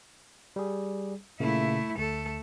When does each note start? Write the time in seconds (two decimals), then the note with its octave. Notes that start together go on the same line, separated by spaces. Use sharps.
0.56 G3 G#4
1.40 A#2 C#3 A3 A#3 E4
1.97 D2 A3 A4